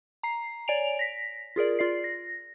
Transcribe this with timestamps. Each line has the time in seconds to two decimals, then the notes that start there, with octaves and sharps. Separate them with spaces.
0.23 A#5 C7
0.68 C#5 D5 G#5 D7 F7
0.99 A#6 B6
1.56 F4 G#4 A#4 D5
1.79 F4 D5 C7
2.04 A#6